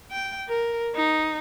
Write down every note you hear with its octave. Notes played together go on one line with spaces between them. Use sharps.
G5
A#4
D#4